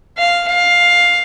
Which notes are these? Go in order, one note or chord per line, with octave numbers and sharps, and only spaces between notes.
F5
F5